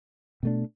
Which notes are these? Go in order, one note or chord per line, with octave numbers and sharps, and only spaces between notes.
B2 A3 D4